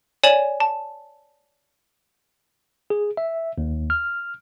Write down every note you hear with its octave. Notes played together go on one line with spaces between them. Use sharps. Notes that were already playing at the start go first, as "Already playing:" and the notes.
C#5 D5 G#5 E7 F#7
A5
G#4
E5
D#2
F6